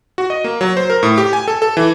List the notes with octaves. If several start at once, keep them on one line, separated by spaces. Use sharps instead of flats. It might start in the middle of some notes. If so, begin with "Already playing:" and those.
F#4
D#5
A#3
F#3
C5
A#4
A2
G4
G#5
A4
A4
E3